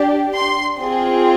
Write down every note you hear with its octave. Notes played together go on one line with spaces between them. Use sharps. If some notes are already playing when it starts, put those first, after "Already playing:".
Already playing: D4 G4
C6
C4 F4 G#4